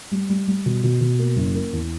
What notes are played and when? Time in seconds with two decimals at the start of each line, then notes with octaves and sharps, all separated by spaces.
0.11 G3
0.29 G3
0.47 G3
0.66 B2
0.84 B2
1.01 B2
1.19 A#3
1.36 F#1
1.54 A#3
1.73 E2